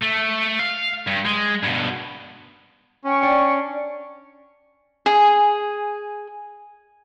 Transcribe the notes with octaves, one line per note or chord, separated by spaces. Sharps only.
A3
F5
G2
G#3
G2 B2
C#4 G5 C#6
D4
G#4 G#5